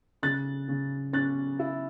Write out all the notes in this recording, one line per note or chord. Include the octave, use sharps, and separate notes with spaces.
C#3 F#6 A6
C#3
C#4 F#6 A6
E4